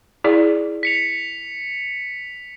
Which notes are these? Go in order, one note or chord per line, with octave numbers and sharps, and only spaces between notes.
E4 G#4 D5
B6 C#7 F7